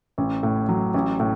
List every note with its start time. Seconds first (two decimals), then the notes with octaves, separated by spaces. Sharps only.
0.18 A1
0.43 A2
0.69 F#3
0.94 A1
1.20 A2